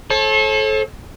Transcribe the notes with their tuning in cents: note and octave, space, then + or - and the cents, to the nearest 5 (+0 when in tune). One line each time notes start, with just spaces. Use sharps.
A4 -25 C#5 -45